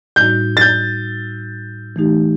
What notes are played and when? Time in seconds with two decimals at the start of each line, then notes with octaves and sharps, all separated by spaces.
0.16 A2 G3 D#4 F#4 G6
0.57 A6
0.61 G6
1.96 E3 A3 D#4 G4